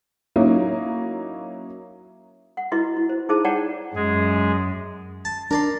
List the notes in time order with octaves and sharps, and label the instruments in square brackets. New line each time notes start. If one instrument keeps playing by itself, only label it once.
[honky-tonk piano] F#3 A#3 C#4 D#4 E4
[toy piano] F#5
E4 F#4 B4 D#5 E5
E4
C5
D#4 E4 G#4 C5 E5 A5
C#5 D5 F#5 G5 A5 A#5
[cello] F#2 [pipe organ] G#3 G#4
[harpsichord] A5
[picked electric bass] D4 [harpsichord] A#4 D5 C6